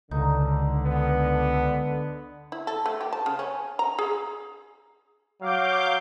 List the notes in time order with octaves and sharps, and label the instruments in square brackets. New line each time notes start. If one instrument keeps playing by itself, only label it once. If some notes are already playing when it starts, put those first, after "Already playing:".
[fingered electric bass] C#2 [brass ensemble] D3 [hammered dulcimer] D#4
[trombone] B3
[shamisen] E4
A4
A3
G4
A5
C#3
C#4
A#5
G#4
[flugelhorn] F#3 [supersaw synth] F5 D6 G6